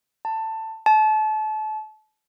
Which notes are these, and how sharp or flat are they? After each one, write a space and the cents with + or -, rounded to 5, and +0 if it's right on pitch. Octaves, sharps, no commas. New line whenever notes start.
A5 +15
A5 -30